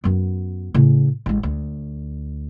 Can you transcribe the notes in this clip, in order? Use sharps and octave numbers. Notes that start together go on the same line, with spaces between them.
F#2 B3
A2 C#3
A1 G#3
D2